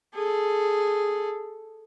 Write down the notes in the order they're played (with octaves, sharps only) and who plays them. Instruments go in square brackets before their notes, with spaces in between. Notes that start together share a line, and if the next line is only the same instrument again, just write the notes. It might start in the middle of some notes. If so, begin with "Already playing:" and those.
[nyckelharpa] G#4 A4